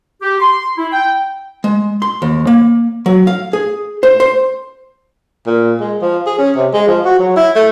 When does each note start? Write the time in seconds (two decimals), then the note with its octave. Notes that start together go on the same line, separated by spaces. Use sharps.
0.22 G4
0.40 C6
0.78 E4
0.92 G5
1.64 G#3
2.02 C6
2.22 D#2
2.47 A#3
3.06 F#3
3.27 F5
3.53 G#4
4.03 C5
4.20 C5
5.47 A#2
5.81 G#3
6.02 F3
6.27 G#4
6.39 C#4
6.56 C3
6.74 G#3
6.88 F3
7.05 F#4
7.20 F#3
7.37 E4
7.56 A3